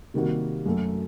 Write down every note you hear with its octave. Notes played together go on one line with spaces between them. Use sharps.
C3 D#3 G3 A#3 F#4
F#2 F#3 A3